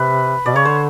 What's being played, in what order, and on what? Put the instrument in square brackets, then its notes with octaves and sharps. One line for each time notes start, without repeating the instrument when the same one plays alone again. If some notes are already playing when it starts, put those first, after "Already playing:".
Already playing: [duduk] C3 [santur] B4
[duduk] B2 [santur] D5
[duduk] C#3 [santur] C#5
[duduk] D3 [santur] C5